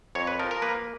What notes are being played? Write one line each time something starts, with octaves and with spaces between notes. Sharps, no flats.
F2 C#5
B4
F3 A#4
A#4
A#3 B4